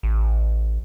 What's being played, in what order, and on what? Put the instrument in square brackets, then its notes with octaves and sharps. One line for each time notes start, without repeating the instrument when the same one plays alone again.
[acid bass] A1